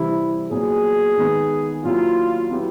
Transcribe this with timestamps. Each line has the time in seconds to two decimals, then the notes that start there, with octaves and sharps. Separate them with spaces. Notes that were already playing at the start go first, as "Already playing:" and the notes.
Already playing: C3 E3 G3 E4
0.50 A#2 F#3 B3 G#4
1.17 D#3 G#3 B3
1.84 A#2 F#3 B3 E4 F4 G4
2.50 F#3 B3 E4 G4